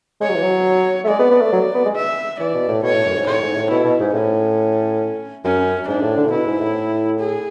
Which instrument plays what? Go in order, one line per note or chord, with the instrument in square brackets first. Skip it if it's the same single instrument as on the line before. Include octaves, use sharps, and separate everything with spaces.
[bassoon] G#3 [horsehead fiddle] C#5
[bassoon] F#3
E3
F#3
A3
[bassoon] G#3 [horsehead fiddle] D5
[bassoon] B3
B3
A3
F#3
B3
G#3
[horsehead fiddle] E5
[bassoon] E3 [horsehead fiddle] D5
[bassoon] B2
A2
[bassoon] B2 [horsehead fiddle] C#5
[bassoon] A2
F#2
G#2
[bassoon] A2 [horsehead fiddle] C#5
[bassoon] G#2
A2
[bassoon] B2 [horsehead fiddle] E4
[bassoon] B2
G#2
[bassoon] A2 [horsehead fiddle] C#4
[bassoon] F#2 [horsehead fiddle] C#4
[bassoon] G#2 [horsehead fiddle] D4
[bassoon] A2
D3
A2
[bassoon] B2 [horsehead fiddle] E4
[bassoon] G#2
A2
[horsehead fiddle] G#4